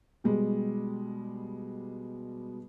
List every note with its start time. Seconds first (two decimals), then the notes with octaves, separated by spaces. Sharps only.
0.24 B2 G3 G#3